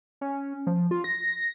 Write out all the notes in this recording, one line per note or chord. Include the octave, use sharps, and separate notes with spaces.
C#4
F3
F4
A#6